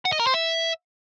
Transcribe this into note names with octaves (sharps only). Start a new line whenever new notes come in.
F#5
D#5
A#4
C5
E5